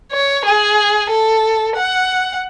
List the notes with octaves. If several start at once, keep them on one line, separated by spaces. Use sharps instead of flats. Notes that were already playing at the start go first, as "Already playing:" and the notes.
C#5
G#4
A4
F#5